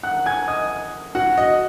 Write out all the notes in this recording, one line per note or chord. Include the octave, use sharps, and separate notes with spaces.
F#5 F#6
G#5 G#6
D#5 D#6
F#4 F#5
D#5